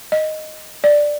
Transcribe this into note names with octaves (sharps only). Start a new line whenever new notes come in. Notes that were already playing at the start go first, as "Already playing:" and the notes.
D#5
D5